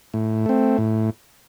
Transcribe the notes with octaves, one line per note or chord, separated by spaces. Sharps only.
A2
A3 C4
A2